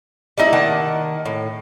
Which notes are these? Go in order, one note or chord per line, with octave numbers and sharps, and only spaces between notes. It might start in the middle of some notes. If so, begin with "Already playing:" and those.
G3 A3 D#4 E4
D#3 A#3 F#5 A5
A2